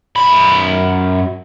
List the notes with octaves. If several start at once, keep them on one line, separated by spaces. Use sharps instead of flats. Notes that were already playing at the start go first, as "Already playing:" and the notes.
F#2 B5